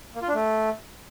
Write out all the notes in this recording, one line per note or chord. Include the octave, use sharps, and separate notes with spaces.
A#3
F4
D4
A3